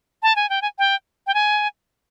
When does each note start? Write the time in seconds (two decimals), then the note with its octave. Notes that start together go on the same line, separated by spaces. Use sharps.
0.23 A5
0.36 G#5
0.49 G5
0.62 G#5
0.78 G5
1.27 G5
1.34 G#5